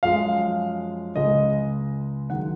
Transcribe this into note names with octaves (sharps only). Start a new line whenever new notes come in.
F#2 F3 G#3 F5
C#2 C#3 G#3 D#5
D#3 F#3 F#5